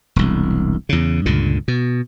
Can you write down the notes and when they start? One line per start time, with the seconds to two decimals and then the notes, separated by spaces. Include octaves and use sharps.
0.16 E1 C2
0.89 E2 C#3
1.26 C#2 G2 A#2 D3
1.68 B2